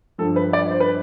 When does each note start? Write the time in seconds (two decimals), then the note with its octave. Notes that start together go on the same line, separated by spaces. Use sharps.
0.18 G2 F3 A4
0.36 B4
0.53 D5
0.71 C5
0.80 B4